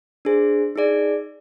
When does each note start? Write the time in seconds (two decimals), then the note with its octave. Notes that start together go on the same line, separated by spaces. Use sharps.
0.25 D4 G#4 C5
0.76 D#4 G#4 D5